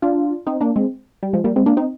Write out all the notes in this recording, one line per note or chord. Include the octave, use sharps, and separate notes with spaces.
D4 F4
C4 D#4
A#3 D4
G#3 C4
G3
F3 G#3
G3 A#3
G#3 C4
A#3 D4
C4 D#4